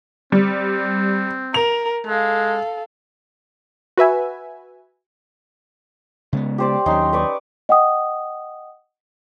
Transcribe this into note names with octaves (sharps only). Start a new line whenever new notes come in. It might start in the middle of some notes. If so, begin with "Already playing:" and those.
G3 C4
A#4 F7
G#3 A4 F5
F#4 B4 E5 G#5
C#3 G#3 B3
G4 C5 D5
D#2 F#3 C#4 D#4 C6
B4 D5 C#6
D#5 F#5 G5 D#6